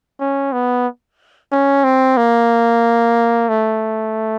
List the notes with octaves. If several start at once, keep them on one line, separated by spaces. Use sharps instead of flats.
C#4
B3
C#4
C4
A#3
A3